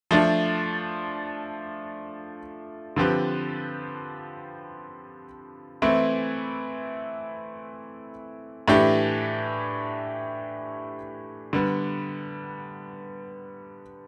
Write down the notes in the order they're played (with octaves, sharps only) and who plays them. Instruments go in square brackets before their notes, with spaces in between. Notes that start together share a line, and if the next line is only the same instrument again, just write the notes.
[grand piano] F3 A3 D4 F4
D3 F3 C4 G4 B4
E3 A3 C4 E4
A2 E3 A3 D4 G4
D3 G3 B3